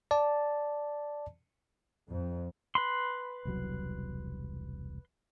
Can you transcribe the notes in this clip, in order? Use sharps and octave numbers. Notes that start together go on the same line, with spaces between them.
D5 A5
F2
B4 B5 C6
E1 C2 F#3